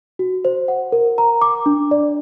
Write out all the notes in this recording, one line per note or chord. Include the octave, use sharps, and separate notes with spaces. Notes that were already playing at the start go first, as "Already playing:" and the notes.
F#4
C5
F#5
A#4
A#5
D6
D4
D5